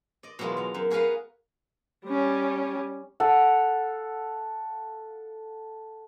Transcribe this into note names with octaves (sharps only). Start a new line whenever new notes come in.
D5 D#5
B2 E3 F#3 G#3 F4
F#3 A#5
F#2
F#4 G#4 A#4 B4 F5 F#5
G3 C#4
A4 F5 F#5